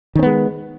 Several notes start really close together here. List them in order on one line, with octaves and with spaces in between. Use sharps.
D#3 C#4 B3 G#3